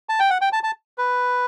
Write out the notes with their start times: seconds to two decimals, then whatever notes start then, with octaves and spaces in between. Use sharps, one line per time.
0.09 A5
0.19 G5
0.30 F#5
0.41 G5
0.53 A5
0.63 A5
0.98 B4